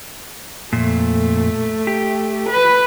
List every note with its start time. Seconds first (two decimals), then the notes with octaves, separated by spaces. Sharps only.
0.73 F2 A#2 A3
1.87 G4
2.48 B4